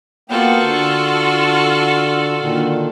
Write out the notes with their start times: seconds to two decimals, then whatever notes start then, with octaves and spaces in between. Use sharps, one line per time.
0.30 A#3 B3 F4 F#4 A4 G5
0.61 D3
2.40 A#2 D3 D#3